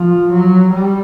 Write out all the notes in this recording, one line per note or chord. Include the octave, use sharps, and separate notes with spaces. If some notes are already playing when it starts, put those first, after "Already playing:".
Already playing: F3
F#3
G3